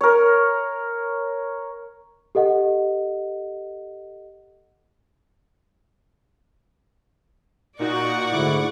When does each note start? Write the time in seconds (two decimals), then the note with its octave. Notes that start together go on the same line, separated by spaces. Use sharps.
0.01 A#4 C#5
2.35 G4 A4 D#5 F#5
7.79 A#2 D#4 F#4 D5 F#5 C#6
8.33 D2 G#2 D3 E4 D6